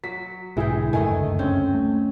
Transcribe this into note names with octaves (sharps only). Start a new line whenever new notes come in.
F#3 B6
B1 G#2 D3 E3 G#3 E4 G#4 G5
F#1 D2 G2 D#3 A3 D#5 G#5
C4 C#4
A3